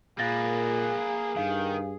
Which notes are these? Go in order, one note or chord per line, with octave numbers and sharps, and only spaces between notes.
A#2 A#3 G#4 B4 F5 A6 A#6
G2 D#3 F5